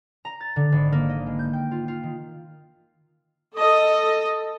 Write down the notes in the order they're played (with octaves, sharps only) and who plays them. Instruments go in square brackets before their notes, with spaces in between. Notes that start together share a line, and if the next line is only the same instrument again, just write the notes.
[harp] A#5
A6
D3
G#1
A#3
D#5
G#3
G6
G5
F4
F4
D#3
[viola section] A4 D#5